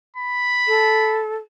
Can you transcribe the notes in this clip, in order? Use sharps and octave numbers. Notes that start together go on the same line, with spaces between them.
B5
A4